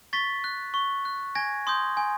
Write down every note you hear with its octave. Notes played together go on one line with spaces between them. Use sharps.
C#6 A6 B6
F#6
C#6
F#6
G#5 G#6 A#6
C6 D#6 G6
G#5